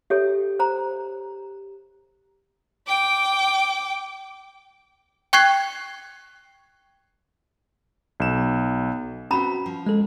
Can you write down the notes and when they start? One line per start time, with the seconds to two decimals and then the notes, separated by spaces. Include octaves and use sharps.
0.10 G4 A4 C#5 E5
0.59 C5 A#5
2.88 G5 D6
5.33 G5 C#6 F#6 G#6 C7
8.20 B1 E7
9.31 C4 C#4 F#4 B4 A#5 B5
9.66 F3
9.87 G#3 A4